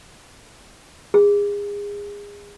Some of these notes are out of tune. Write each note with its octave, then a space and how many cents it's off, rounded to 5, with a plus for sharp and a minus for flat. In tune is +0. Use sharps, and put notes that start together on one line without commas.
G#4 -30